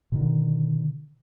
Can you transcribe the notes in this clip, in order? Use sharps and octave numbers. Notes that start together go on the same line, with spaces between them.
B2 D3 D#3